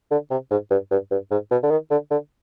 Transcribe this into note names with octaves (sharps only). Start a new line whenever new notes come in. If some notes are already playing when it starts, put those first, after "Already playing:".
D3
C3
G#2
G2
G2
G2
G#2
B2
D3
D#3
D3
D3